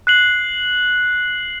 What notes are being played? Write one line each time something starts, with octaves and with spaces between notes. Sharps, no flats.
F#6 C7 F#7